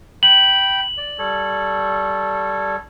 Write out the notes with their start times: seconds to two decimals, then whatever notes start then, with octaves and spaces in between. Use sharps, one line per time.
0.23 G5 B5 F#7
0.98 D5
1.19 G3 A4 C#5